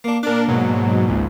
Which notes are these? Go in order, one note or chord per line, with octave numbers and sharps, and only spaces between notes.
A#3 D4
A#2 D4 A#4 D6
G#2 B2 F#3
G#1 C#2 G#2